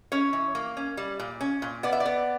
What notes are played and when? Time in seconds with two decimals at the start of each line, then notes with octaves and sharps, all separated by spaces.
0.12 C#4 C#5
0.33 E3
0.55 A#3
0.77 C#4
0.97 G3
1.20 A#2
1.41 C#4
1.62 A#2
1.83 B3 D5
1.93 E5
2.00 D5
2.06 B3